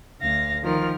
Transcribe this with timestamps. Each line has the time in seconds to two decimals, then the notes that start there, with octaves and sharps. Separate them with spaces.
0.20 D2 F5 A#6
0.63 D#3 F3 A#4 F6